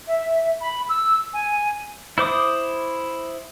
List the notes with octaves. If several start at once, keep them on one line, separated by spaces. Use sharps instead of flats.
E5
B5
E6
G#5
E4 C5 D6 D#6